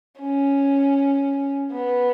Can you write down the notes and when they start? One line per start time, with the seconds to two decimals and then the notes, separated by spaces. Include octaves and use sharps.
0.20 C#4
1.72 B3